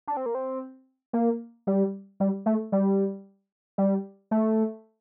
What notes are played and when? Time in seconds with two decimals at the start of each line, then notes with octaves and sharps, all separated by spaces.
0.07 D4
0.17 C4
0.26 A#3
0.35 C4
1.13 A#3
1.67 G3
2.20 G3
2.46 A3
2.72 G3
3.78 G3
4.31 A3